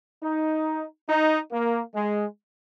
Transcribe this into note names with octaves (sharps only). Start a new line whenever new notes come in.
D#4
D#4
A#3
G#3